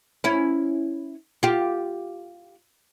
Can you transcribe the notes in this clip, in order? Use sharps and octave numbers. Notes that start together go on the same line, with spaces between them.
C#4 E4
F4 G4